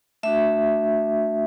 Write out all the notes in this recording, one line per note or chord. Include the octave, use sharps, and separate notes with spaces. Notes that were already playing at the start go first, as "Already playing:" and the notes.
A3 D4 F#4 E5